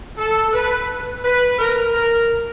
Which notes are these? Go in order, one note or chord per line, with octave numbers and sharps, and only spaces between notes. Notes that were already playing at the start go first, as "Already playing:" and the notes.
A4
B4
B4
A#4
A#4